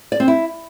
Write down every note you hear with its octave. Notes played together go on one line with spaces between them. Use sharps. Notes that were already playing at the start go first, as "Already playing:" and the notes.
D5
C4
E4